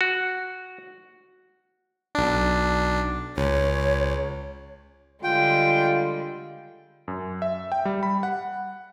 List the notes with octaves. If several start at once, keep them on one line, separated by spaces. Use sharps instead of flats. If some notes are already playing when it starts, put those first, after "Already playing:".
F#4
B1 D4
C#2 C#5
D3 G3 G#3 F4 G5
F#2
E5
G5
G3
B5
F#5